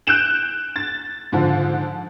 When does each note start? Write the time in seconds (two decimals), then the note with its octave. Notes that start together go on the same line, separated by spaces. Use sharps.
0.07 F#6 G6 D7 E7 F#7
0.76 A6
1.32 G#2 D3 F3